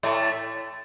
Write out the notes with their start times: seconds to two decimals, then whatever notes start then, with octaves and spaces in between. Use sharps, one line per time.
0.03 A2 A3